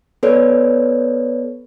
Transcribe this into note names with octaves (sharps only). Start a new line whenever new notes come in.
B3 A4 B4 C#5 D5